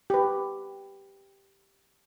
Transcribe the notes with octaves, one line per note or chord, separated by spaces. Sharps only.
G4 B4